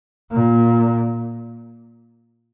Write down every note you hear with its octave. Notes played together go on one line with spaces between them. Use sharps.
A#2